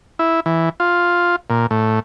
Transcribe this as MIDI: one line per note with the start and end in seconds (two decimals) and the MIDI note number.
0.19 0.40 64
0.46 0.69 52
0.80 1.36 65
1.50 1.67 46
1.71 2.00 45